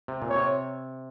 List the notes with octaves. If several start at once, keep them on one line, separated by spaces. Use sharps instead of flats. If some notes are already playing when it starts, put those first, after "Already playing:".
C3
A#2
C#5
C3